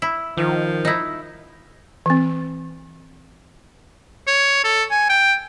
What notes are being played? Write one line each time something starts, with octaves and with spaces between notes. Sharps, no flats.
E4
D#3 F3
D#4 E4
E3 C4
C#5
A4
G#5
G5